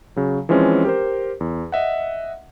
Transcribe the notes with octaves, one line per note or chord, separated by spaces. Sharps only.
C#3 F#3
E3 F3 G#3 C4 C#4
G4 A#4 C5
E2
D#5 E5 F#5